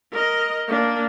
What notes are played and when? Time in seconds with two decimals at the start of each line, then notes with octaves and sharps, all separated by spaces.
0.12 A#4 D#5
0.68 A#3 D4